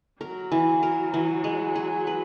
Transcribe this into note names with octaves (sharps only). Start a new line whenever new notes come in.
F#3 A#4
E3
A#4
E3
G#3
G#4
B4